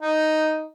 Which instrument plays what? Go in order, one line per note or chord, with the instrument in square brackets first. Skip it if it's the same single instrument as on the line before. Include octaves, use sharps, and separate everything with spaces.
[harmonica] D#4